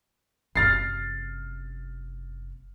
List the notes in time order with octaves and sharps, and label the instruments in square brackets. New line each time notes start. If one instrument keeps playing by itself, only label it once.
[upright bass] F#1 C3 [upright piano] F6 A6 C7